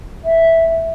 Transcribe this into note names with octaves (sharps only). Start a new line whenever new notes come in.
E5